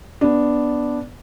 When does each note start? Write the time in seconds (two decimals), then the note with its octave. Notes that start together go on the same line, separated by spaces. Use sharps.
0.21 B3 D4